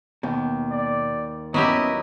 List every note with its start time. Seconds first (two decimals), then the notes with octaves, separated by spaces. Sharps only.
0.23 D#2 B2
0.71 D5
1.54 F#3 B3 C#4 E4 G4 D#5